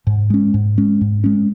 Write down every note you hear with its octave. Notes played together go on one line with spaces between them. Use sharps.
G#2
G#3 C#4
G#2
G#3 C#4
G#2
G#3 C#4